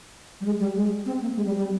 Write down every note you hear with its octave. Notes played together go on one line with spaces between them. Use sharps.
G3
G#3
G3
G#3
C4
A#3
G#3
G3
G3